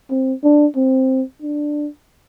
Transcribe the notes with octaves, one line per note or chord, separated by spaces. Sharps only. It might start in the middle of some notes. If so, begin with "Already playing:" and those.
C4
D4
C4
D4